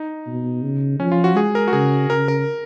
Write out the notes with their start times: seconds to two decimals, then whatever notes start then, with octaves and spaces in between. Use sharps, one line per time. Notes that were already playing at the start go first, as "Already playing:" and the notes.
Already playing: D#4
0.26 B2
0.62 C#3
1.00 F3 C#4
1.12 F4
1.24 F#4
1.36 G#3 G#4
1.55 A#4
1.68 F#4
1.73 C#3 G#4
2.10 C#3 A#4
2.28 A#4